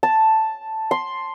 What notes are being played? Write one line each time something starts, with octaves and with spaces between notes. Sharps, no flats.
A5
C6